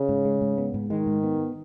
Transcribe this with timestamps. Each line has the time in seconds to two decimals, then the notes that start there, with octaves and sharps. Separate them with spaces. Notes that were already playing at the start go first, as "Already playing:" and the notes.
Already playing: C#3
0.09 G#2
0.25 G#3
0.42 G#2
0.58 B3
0.74 G#2
0.90 D#3 G#3
1.07 G#2
1.23 B3